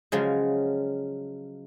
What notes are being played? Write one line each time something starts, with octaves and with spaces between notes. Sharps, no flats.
C#3 F3 F#3 G#3